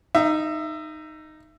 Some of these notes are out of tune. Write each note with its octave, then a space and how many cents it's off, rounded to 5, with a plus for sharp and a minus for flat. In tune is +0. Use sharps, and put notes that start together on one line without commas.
D#4 -5 E5 +20